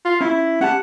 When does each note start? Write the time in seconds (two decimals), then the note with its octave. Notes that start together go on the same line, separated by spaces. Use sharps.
0.05 F4
0.21 C#4 E4
0.61 C#4 G4 F#5 A5